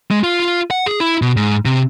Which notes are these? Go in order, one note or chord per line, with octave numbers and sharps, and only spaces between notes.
G#3
F4
F#5
G#4
E4
B2
G#2
C3